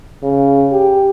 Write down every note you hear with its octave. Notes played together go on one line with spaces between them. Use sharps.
C#3
G4